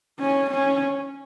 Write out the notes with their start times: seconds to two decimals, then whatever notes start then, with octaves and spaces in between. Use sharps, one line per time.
0.20 C#4
0.50 C#4